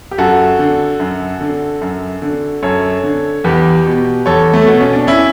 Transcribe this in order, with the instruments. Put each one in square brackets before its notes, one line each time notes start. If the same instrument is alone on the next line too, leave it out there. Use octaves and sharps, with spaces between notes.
[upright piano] G4
F#2 F#4 A4
D3
F#2
D3
F#2
D3
F#2 A4 C#5
D3
E2 G4 B4
B2
E2 A4 C#5
A3
B2 B3
C#4
D4
C#4 E4